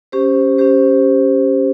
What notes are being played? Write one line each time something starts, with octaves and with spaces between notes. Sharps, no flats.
C#4 G4 C5
C#4 G4 C5